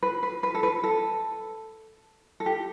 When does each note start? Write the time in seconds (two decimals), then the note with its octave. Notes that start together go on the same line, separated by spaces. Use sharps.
0.03 B4
0.23 B4
0.43 B4
0.55 A4
0.63 B4
0.84 A4
2.40 A4
2.46 G4